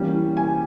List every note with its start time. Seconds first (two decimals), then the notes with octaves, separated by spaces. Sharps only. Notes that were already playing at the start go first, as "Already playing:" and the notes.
Already playing: E3 G3 A#3 C#4
0.37 G#5